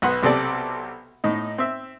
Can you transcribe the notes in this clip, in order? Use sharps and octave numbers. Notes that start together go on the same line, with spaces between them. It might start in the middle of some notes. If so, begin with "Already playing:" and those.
B1 B4 F#5 C6
B1 C3 C4 A4 D5
A2 D#4
C4 E5